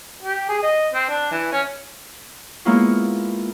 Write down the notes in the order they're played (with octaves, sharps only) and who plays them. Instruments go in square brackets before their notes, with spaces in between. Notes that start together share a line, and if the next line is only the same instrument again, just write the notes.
[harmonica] G4
G#4
D#5
C4
D4
E3
C#4
[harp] G#3 A#3 B3 E4 F4 C#5